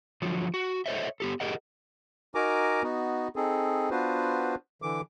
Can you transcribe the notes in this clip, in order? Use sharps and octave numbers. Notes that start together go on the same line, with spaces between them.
D3 F3 F#3
F#4
A4 C5 C#5 D#5 E5
B3 G4 A4
G4 G#4 A#4 D#5 F#5
D#4 F#4 A#4 G#5 A#5 D6
B3 D#4 F#4
C4 D#4 G#4 A4
B3 D4 F4 F#4 B4 C5
D3 E3 D6